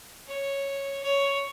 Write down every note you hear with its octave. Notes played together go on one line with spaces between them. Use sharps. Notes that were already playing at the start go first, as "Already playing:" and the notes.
C#5
C#5